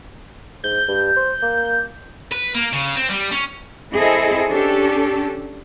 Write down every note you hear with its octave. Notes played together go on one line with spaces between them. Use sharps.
G#2 G6
G2
C5
A#3
B4
A#3
C#3
C4
G3
C#4
C4 E4 G#4 A4 D#5
C#4 D4 G4 A4